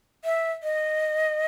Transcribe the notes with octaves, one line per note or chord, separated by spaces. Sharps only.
E5
D#5